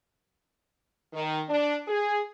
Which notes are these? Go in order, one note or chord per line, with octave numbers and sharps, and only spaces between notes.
D#3
D4
G#4